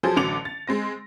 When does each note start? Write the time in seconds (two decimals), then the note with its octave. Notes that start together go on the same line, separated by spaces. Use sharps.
0.03 F3 F#3 G#4 A4 C5
0.16 A1 D3 F#3 D6 C#7 F7
0.45 A6
0.67 G#3 C4 A#6